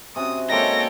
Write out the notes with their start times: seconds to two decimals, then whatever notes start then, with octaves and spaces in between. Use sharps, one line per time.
0.16 C3 C#4 F#4 D#6
0.49 G#3 A#3 D#4 A4 C#5 G5 A#6